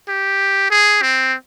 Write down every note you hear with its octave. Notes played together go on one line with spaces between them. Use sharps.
G4
G#4
C4